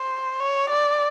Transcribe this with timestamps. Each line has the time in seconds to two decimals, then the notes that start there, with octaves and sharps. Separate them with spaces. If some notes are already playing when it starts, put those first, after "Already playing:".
Already playing: C5
0.40 C#5
0.70 D5